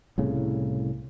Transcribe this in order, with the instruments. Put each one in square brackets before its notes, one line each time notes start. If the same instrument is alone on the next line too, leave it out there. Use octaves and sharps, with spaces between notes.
[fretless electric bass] C2 A2 C#3